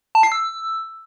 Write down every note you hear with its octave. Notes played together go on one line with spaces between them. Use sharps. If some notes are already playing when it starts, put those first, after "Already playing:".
A5
C7
E6